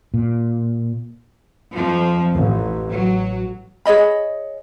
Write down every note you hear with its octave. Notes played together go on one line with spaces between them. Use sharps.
A#2
F2 F3
A1
F#3
G#4 C#5 D#5 B5